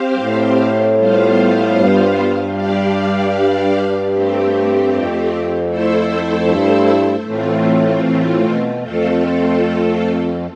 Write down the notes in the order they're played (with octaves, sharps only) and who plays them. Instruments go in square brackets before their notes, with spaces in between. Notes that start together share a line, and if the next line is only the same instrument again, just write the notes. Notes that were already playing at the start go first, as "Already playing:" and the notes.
Already playing: [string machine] C4 G4 C5 F5
[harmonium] G2
A2
[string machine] G3 B3 F4 C5 F5
[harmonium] G2
[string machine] G3 D4 G4 D5 F5
A3 C4 G4
[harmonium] F2
[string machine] A3 E4 A4 C5 E5
[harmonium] G2
G2
[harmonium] A2 [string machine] E3 A3 C4 F4
[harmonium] A2
B2
[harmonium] F2 [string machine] A3 C4 F4 A4